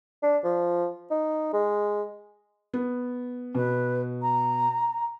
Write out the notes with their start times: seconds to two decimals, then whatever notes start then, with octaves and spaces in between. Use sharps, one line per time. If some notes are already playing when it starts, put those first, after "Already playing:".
0.23 D4
0.44 F3
1.10 D#4
1.53 G#3
2.74 B3
3.55 B2 B4
4.21 A#5